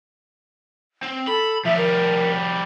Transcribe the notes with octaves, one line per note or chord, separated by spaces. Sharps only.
C4
A4 B5
F3 G3 E5
A#4